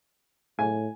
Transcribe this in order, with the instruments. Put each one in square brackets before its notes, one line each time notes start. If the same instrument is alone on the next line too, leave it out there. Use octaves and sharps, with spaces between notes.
[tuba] A2 [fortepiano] G#5